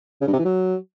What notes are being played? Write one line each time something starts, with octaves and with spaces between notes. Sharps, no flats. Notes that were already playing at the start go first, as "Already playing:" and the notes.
C#3
G2
C3
E3
F#3